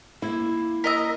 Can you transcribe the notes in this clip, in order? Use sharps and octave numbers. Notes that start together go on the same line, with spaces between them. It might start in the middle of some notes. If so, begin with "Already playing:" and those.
A#3 E4
A#4 D#5 A#5 E6 B6